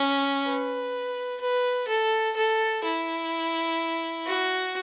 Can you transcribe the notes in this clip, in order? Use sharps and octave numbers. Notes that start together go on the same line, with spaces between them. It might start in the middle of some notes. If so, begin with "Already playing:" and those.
Already playing: C#4
B4
B4
A4
A4
E4
F#4